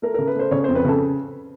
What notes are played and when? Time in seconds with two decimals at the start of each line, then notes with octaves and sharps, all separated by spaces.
0.02 A3 A#4
0.14 C#3 A#4
0.27 B4
0.35 A3 C5
0.51 C#3 C#5
0.64 F2 C5
0.75 B4
0.84 C#3 A4